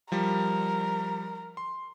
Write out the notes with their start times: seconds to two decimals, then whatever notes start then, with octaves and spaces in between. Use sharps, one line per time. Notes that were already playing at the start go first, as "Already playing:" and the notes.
0.12 F3 G3 A#4
1.57 C6